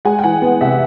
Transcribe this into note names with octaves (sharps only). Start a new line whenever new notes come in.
G#3 F#5 G#5
G5
E3 F#5 G#5
B3
C3 E5 F#5